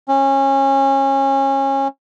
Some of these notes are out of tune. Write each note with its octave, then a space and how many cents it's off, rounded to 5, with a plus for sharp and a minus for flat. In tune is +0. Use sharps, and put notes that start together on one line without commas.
C#4 -25